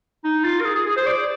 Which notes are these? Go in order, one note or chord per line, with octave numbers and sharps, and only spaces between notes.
D#4
F4
A#4
G#4
G#4
G#4
C5
D5